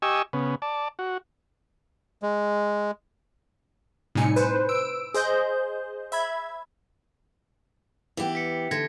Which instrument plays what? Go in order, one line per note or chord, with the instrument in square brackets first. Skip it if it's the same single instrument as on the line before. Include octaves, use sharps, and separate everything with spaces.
[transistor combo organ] G4 D#5 G#5 C#6 E6
C#3 B3
D5 A5
F#4
[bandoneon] G#3
[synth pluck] A2 C3 G3 D#4 G#5 C#7
B4 C5
E6 D7
G#4 C5 D#5 G6
E5 B5 G#6
[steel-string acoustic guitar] E3 B3 G4
[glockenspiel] B6 C#7
[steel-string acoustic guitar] D3 [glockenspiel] G#6 A#6 C#7